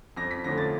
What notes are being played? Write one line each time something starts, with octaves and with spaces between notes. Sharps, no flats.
F2 A#6
B6
D3 F3 A3 C#4 A#6
A6